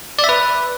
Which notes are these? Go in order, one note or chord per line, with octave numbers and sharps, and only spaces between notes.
D5
E5
B4